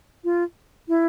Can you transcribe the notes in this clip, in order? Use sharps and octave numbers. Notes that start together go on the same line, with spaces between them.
F4
E4